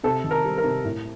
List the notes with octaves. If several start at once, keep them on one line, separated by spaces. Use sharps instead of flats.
C3 A4
D#3
A#4
G3
A#4
C3
A2